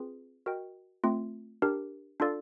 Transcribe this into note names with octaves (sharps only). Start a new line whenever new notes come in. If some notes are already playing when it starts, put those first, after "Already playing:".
Already playing: C4 F4 G#4 B4
F#4 A#4 D#5 G5
A3 C4 F4
D4 G4 A#4
D4 F4 A4 D5 F5